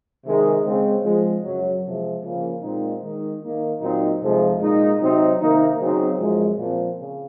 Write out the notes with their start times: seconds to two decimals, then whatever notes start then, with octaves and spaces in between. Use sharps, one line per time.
0.25 C3 D#3 G#3 D#4
0.64 C#3 G#3 C4
1.04 G#2 F3 G#3
1.43 F#2 C#3 F#3
1.83 C3 F3 G#3
2.22 C#3 F3 A#3 C#4
2.62 A#2 G#3 C4 D#4
3.02 D#3 G#3 D#4
3.41 D#3 A#3 D#4
3.81 A#2 F#3 C4 D#4
4.20 F2 C3 F3 G#3 D#4
4.60 A#2 G#3 D#4
5.00 C3 F#3 C4 D#4
5.40 C3 D#3 A#3 D#4
5.79 C#3 F#3 C4 D#4
6.18 F#2 F3 G#3
6.57 A#2 F3 C4
6.97 C#3